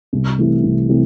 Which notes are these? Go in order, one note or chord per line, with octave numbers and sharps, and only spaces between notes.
C2
C3 E3 A3
C2
C3 E3 A3